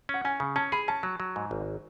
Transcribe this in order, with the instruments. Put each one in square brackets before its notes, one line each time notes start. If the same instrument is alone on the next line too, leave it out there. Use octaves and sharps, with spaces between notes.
[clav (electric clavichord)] C#4 [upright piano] F#5
[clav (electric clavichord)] C#4 [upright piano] G#5
[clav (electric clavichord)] C#3
[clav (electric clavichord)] C#4 [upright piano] A5
[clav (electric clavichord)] G#4 [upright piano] B5
[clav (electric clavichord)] C#4 [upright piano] A5
[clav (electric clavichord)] F#3
F#3
G#2
G#1